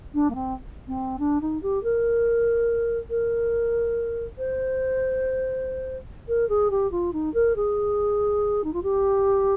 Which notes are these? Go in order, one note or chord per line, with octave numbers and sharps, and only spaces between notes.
D4
A#3
C4
C4
D4
D#4
G4
A#4
A#4
C5
A#4
G#4
G4
F4
D#4
A#4
G#4
D#4
F4
G4